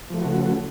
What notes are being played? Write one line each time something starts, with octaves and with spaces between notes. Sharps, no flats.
C#3 E3 F3 A3 F#4